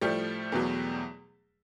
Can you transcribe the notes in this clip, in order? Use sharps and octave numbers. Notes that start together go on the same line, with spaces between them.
A2 F3 G3 A3
E2 B2 F#3